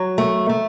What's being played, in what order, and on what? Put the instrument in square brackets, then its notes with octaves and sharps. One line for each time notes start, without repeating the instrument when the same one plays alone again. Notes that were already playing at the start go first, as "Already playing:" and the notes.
Already playing: [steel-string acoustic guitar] F#3
A3
A3